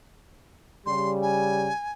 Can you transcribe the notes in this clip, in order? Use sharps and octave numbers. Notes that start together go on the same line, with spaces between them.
C#3 G3 C6
G#5